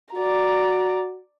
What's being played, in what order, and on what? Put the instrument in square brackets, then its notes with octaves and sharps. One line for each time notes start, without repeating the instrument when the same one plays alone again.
[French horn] F#4 [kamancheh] D5 A#5